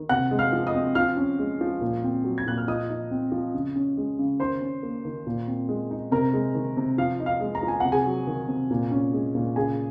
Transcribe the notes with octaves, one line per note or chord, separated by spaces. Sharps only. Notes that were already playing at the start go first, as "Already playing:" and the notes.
Already playing: D#3
C3 F#5 F#6
G#3
F5 F6
F3
D#5 D#6
C4
F3 F5 F6
C#4
G#3
F3
A#2
C4
F#3
G#6
A#2 F#6
F6
F3 D#5 D#6
D#4
C4
F3
C#3
C#4
G#3
C#3
D#3 C5 C6
C#4
A#3
D#3
A#2
C4
G#3
D#4
C3 A#4 A#5
G#3
D#3
C3
F3 F5
D#4
F5
G#3
A#5
F3
G#5
C3 F#5
G#4 G#5
F#3
D#3
C3
A#2
C#4
G#3
A#2
C#3 G#4 G#5